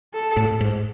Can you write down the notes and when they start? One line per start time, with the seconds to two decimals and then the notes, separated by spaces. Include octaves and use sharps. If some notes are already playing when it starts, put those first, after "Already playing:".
0.13 A4
0.37 A2
0.61 G#2